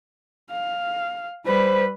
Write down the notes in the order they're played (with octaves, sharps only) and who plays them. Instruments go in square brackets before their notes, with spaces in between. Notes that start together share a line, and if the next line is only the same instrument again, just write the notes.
[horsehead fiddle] F5
[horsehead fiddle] G3 B4 [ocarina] C5